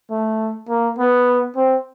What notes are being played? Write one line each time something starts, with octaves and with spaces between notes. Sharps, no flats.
A3
A#3
B3
C4